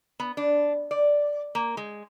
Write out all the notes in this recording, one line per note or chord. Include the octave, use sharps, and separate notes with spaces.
B3
D4
D5
A#3
G#3